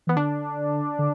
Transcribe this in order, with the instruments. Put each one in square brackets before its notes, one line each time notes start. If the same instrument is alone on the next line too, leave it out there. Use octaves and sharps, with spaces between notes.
[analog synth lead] E3 [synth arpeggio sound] B3
[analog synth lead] D3 [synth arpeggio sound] D4
[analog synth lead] D3